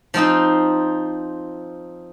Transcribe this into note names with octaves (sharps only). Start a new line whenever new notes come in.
F3 C4 D#4 F4